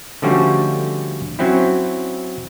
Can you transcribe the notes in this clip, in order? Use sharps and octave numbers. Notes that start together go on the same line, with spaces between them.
D3 F3 G3 A3 C#4 F#4
F#3 C4 C#4 E4